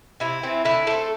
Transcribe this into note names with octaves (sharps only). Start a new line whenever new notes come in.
C3 E4
E3 C4
D3 E4
A3 C4 A4